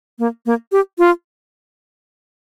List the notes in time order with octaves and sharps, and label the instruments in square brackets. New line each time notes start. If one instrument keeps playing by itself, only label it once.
[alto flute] A#3
A#3
G4
F4